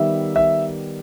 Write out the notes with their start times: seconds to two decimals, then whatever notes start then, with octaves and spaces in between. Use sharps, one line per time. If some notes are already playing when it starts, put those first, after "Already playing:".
Already playing: D#3 G3 B3 D#4 E5
0.36 E5